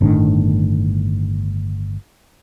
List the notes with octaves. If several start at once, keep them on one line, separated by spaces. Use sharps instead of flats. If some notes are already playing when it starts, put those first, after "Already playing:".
G1 A2 D#3 D4